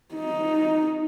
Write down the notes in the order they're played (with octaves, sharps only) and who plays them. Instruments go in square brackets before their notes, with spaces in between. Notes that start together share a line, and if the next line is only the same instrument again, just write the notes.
[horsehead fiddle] D#4